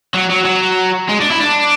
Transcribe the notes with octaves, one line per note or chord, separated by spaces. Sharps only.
F#3
F#3
F#3
G#3
D4
E4
D4